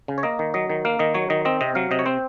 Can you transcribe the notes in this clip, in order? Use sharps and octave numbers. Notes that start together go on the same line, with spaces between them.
C#3
C#5
A#3 D#5
D#3
F#3 D#5
D#3
A#3 F5
D#3 D#5
F#3 C#5
D#3 D#5
C4 D#5
C3 D#5
F#3 F5
C3 D#5
C#5
C4 C5